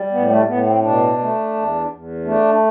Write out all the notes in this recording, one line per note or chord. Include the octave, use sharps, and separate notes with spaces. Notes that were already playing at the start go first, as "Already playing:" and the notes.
Already playing: G3
A2 B3
A3
A2 B3
C4
B2 D4
A3
E2
E2
A3 D4